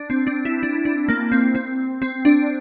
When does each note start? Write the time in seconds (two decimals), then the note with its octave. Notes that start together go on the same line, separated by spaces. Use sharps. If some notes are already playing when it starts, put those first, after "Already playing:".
Already playing: D4
0.10 C4
0.27 D4
0.45 E4
0.63 D4
0.85 D4
1.09 A#3
1.32 C4
1.55 C4
2.02 C4
2.25 D4